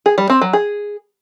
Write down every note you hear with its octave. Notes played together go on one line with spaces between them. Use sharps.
G#4
G3
C4
F#3
G#4